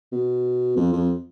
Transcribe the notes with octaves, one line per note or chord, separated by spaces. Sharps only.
B2
F2
F2